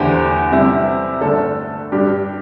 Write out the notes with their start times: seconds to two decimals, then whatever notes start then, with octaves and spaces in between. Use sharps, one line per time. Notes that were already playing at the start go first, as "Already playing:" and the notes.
Already playing: E2 D3 A3 D4 G4 C5
0.52 C3 G3 E4
1.21 G2 D3 A3 D4 A4
1.92 G2 G3 D4 G4